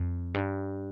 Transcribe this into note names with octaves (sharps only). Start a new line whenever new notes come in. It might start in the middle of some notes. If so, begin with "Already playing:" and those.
Already playing: F2
G2